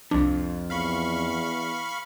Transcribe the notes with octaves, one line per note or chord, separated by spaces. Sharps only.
C2 F2 D4
E2 F5 B5 C#6